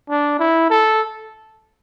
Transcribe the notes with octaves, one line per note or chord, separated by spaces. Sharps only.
D4
E4
A4